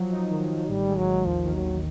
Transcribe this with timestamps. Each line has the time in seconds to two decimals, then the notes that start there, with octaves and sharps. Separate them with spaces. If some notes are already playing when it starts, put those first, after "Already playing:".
Already playing: F3 F#3
0.12 D#4
0.31 D#3
0.49 D#3
0.68 A1 G3
0.88 G#3
0.97 F#3
1.06 A1
1.26 D#2 F3
1.45 D#3
1.54 F#3
1.64 D#2